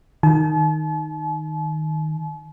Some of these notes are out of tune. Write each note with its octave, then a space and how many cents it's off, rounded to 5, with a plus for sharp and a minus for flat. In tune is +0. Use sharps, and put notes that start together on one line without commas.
D#3 +0 A5 -45